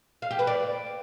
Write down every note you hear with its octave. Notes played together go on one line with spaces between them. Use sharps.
F5
G4
B4
D5